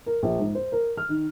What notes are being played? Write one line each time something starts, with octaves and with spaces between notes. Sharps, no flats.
A#4
A#1
G#2
C5
A#4
F6
D#3